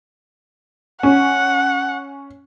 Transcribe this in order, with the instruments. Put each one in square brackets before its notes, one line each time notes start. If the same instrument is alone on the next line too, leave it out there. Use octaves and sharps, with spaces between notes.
[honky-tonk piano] C#4 [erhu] F#5